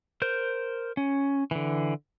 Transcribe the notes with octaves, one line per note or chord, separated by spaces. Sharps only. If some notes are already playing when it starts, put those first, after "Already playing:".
A#4 C5 G6
C#4
D3 E3